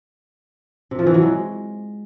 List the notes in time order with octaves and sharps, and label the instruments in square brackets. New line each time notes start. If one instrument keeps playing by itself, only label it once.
[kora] C3
F3
E3
F#3
G#3